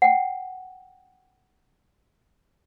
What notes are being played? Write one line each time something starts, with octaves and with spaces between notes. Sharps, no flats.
F#5 G5